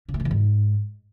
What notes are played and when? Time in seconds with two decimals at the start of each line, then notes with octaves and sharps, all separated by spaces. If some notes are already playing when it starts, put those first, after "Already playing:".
0.09 C#3
0.14 A3
0.20 C#3
0.25 E2
0.31 G#2